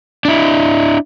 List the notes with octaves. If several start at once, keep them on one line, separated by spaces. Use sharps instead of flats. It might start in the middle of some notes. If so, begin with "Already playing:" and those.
D4 E4